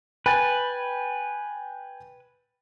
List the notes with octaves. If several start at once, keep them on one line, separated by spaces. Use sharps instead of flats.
B4 G5 G#5 A6